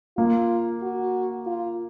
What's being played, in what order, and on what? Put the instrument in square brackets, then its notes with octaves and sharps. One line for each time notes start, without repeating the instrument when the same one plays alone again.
[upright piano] A#3 [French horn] F4
[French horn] F#4
F4